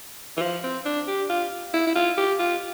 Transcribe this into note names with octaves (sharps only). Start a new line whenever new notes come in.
E3
F3
C4
D4
G4
F4
E4
E4
F4
G4
F4